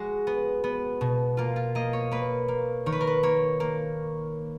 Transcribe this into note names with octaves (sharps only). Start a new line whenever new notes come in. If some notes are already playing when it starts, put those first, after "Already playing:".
Already playing: G#3 F#4
B3
B3
B2
A#3 F4
F4
A#3 D#5
C#5
A#3 B4
A#3
D#3 C#5
B4
A#4
B4
A#3 C#5
A#3